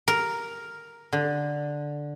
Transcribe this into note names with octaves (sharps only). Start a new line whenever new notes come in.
A#4
D3